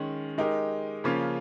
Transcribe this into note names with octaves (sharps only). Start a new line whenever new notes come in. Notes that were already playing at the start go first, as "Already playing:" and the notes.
Already playing: D#3 G#3 C#4
G#3 D#4 G4 A#4
C#3 F3 A#3 C#4 F4